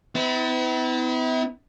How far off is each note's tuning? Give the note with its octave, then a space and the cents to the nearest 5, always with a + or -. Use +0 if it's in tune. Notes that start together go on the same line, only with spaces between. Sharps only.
B3 +45 E4 -30